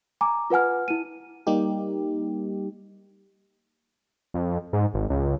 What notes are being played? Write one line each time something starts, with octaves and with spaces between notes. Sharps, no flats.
G#5 A#5 D6
F4 B4 F#5 G#5 F6
E4 D#7
G3 A#3 D#4 G4
F2
G#2
G#1
C#2